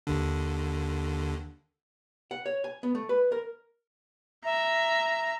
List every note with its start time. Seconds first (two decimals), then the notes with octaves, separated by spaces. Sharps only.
0.07 D#2 D3
2.31 F#5
2.46 C#5
2.64 G#5
2.83 B3
2.95 A3
3.09 B4
3.32 A#4
4.45 E5 A#5